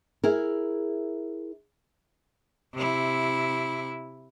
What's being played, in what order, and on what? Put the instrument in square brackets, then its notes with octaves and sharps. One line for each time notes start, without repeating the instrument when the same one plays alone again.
[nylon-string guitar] E4 G#4 A#4
[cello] C3 E4